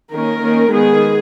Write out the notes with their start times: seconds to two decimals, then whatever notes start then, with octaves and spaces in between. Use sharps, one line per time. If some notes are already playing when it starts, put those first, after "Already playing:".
0.12 D#3 A#3 C#4 A#4
0.42 D#3 A#3 C#4
0.72 D#3 G#3 B3 G#4